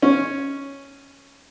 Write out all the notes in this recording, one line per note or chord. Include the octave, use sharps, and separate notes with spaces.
C#4